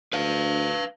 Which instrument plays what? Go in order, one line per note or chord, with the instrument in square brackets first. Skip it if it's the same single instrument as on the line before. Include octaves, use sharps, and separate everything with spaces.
[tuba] D2 [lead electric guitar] B4 F5